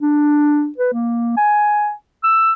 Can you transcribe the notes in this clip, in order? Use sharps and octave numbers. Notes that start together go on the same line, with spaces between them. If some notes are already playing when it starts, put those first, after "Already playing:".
D4
B4
A#3
G#5
E6